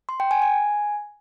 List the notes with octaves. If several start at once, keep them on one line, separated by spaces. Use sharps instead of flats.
C6
G5
G#5
G#5